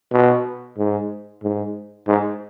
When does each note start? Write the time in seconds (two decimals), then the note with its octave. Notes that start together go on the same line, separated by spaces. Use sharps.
0.12 B2
0.78 G#2
1.43 G#2
2.08 G#2